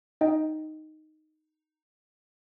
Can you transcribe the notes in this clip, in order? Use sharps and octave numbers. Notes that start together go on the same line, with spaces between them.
D#4 D#5 G5